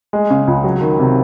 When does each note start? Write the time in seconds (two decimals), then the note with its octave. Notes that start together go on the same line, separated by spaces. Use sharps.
0.13 G#3
0.30 C#3
0.48 C#2
0.64 F#3
0.81 D#3
0.99 C3